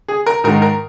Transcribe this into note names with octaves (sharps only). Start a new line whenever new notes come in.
G#4
A#4
G#2 D#3 A#4
A#4